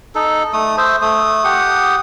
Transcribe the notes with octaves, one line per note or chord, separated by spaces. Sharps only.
D#4 A4
A3 D#6
C5 E5
A3 D#6
G4 F#5 D#6